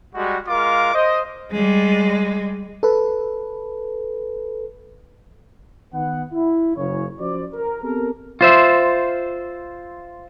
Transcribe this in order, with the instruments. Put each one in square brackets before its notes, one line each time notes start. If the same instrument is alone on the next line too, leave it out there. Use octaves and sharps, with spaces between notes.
[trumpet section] G3 G#3 F#4
G#3 F4 A#4 F5 D6
C5 D#5
[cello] G3 G#3
[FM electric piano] A4 B4
[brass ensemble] D#3 B3 F#5
E4
F#1 C#3 C#5
F3 C#4 F#4 C5 D5
A#4
B3 C4 G4 A4 A#4
[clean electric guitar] F4 C5 E5